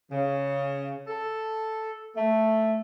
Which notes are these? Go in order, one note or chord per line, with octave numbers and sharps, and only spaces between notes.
C#3
A4
A3